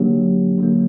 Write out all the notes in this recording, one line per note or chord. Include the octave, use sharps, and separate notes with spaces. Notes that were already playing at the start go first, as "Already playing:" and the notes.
Already playing: D3 F#3 A#3 D4 G4
D3 F#3 A#3